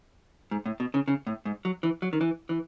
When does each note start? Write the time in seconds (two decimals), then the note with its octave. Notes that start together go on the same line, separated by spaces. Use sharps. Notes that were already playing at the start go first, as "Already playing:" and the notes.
0.51 G#2
0.66 A2
0.80 B2
0.94 C#3
1.08 C#3
1.27 A2
1.45 G#2
1.65 F#3
1.83 E3
2.02 F#3
2.13 D#3
2.21 E3
2.49 E3